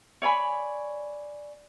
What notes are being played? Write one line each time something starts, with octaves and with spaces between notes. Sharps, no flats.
C#5 D5 G#5 B5